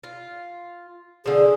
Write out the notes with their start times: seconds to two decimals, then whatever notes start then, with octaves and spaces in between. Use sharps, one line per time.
0.04 F4
1.26 D3 F3 G#4